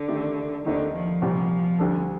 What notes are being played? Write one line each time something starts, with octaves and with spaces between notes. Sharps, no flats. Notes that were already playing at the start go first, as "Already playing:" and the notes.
Already playing: D3
D#3 A3 D#4 G4
D#2 D3 D#3 A3 C4 D#4
F3
C2 A#2 G3 C4
D2 D3 G3 D4 A4